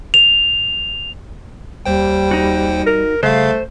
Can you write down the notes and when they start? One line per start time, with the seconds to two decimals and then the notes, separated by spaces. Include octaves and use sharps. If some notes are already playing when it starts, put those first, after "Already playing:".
0.14 F7
1.86 D#2 G3 C5 G5
2.31 D#4 F#4
2.86 A#4
3.23 C#3 G3 A3 C5 F5